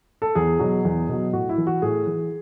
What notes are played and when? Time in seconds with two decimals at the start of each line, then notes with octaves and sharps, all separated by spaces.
0.22 A4
0.35 E2 G#4
0.59 B2 F#3
0.85 E2
1.09 B2 F#3
1.33 A2 F#4
1.49 E4
1.58 E3
1.67 F#4
1.82 A2 G#4
2.07 E3